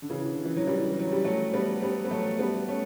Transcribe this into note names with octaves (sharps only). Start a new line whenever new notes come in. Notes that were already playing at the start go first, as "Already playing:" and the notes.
D3
C#3 E3
D3
E3
F#3
E3 G3
F#3
G3
F#3 A3
G3 B3
G3 B3
B3
F#3 A3
G3 B3
A3 C#4